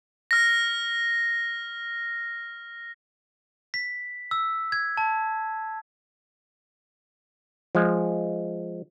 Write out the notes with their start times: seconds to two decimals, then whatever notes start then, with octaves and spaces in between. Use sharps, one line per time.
0.31 F6 A#6
3.74 B6
4.31 E6
4.72 G#6
4.97 A5
7.75 F3 G#3